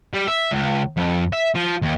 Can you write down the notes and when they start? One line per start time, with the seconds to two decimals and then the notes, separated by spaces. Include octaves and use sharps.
0.14 G3
0.28 E5
0.52 C#2
0.97 F2
1.33 E5
1.55 F3
1.82 D#2